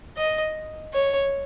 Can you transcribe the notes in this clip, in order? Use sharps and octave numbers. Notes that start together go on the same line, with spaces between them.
D#5
C#5